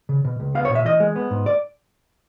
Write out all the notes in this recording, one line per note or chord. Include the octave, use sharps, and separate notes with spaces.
C#3
B2
C#2
B3 F5
C#5
A#2
E5
E3 D#5
G#3
B3
G#2
D5